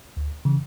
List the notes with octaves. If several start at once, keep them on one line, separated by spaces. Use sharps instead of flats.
D2
C#3 E3